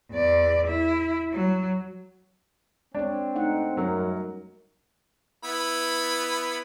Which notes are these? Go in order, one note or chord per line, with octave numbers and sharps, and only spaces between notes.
E2 D5
E4
F#3
G#3 C4 D4 C#5
A3 D#4 F#5
F#2 F#3 G3 A#4
B3 E4 B5